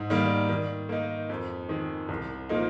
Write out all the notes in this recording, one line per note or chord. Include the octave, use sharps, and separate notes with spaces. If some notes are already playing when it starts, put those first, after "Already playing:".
Already playing: G#2
D#3 G3 A#3
D#3
A#3 D#4
F2
D#3 G#3
C2
A#2 F3 A#3 D#4